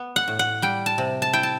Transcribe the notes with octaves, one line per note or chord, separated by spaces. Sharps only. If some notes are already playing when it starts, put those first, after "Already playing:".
Already playing: B3
F#5
A2
F#5
G3 G5
A5
C3
A5
E4 G5
A5